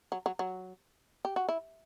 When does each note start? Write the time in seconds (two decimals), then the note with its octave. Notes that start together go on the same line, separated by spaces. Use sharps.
0.12 F#3
0.26 F#3
0.39 F#3
1.25 G4
1.36 F#4
1.49 E4